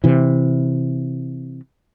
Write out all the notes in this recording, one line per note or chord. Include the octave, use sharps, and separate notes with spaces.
C3 E3